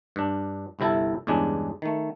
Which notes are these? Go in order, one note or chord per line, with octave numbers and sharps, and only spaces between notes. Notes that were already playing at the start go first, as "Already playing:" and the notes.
G2 D4
G1 C2 C3 E4 A4
E2 G2 C#3 G#3 D4
D#3 A3